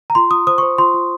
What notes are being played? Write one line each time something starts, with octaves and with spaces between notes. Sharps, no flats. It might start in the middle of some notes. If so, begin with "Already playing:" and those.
A#5
F4 C6
F4 D#6
C5 D#6
C#6
C5
F4 C6
F4